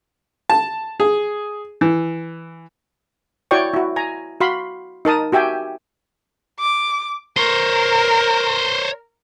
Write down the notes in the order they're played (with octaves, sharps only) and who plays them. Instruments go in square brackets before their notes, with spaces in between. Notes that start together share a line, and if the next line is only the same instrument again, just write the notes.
[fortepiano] A5
G#4
E3
[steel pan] E4 F#4 C#5 D5 G5 C#6
E4 F#4
G#5 A#5
F#4 F5 B5 C6
D#4 A#4 A5 D#6
F#4 G4 E5 G5 G#5
[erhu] D6
[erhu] A#4 [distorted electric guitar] C5 C#5